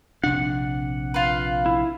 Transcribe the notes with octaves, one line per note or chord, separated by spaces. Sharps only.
A#1 C3 D4 F#5
F4 B4
E4